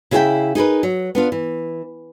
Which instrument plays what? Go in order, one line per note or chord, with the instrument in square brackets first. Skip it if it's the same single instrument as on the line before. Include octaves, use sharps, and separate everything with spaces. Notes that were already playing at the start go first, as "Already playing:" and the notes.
[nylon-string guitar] C#3 E4 G#4 A#4 E5 G5
D#4 G#4 A#4 B4
F#3
B3 D4 F4
E3